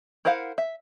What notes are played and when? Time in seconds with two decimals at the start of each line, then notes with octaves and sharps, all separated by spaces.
0.25 E4 A#4 C5 F5 F#5
0.58 E5